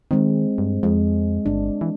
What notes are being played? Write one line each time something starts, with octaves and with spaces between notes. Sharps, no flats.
D#3 G#3 C4
G2
F2 G#3
G1 D4
E3